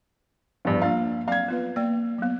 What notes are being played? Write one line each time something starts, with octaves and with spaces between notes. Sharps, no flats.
E2 G2 F3
A#3 D4 F4 F5
F#3 C4 D5 F5 G#6
B3 F4 B4
A#3 D5 G5
F#3 B3